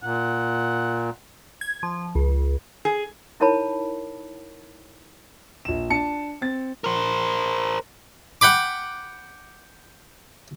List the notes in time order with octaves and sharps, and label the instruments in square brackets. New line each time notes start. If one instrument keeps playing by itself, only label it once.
[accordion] A#2 [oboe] F#5
[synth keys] G#6
F3
C#2
[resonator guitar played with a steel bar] G#4
[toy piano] D#4 E4 A#4 C#5 A5 B5
[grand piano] A#1 E7
D4 A5 C#7
C4 A6
[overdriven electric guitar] A#4 C5
[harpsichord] F#5 G5 B5 D6